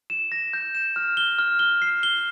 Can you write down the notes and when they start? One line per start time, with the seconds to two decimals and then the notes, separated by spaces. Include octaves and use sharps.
0.10 E7
0.32 A#6
0.53 G6
0.75 E7
0.96 F6
1.17 G7
1.39 F6
1.59 G7
1.82 C7
2.03 G7